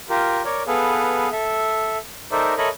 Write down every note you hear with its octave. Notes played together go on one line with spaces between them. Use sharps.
F4 G4 A#4
A#4 C#5 D5
B3 G#4 A4 B4 F5
A4 E5
D#4 A4 A#4 C5 D5 E5
A4 A#4 C#5 D#5 E5 B5